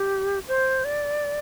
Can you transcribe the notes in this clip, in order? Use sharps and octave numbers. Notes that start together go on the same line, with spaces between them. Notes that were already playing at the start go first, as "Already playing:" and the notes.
Already playing: G4
C5
D5